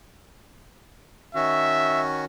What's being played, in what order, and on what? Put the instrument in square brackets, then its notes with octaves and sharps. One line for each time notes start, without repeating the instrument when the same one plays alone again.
[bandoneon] D#3 C#4 F#4 [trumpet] E5